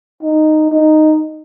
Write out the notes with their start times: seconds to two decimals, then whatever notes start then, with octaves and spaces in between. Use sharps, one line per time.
0.23 D#4
0.72 D#4